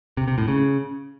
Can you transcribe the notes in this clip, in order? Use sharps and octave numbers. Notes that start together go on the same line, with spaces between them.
C3
C3
A2
C#3